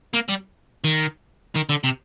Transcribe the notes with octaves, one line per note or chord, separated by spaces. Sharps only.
A#3
G3
D#3
D#3
D3
C3